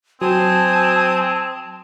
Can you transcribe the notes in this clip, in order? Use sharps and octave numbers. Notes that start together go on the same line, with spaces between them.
F#3 C4 C5 G#5 A5 D#6